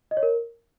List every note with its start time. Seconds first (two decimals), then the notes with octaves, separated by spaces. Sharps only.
0.11 D#5
0.17 C#5
0.23 A#4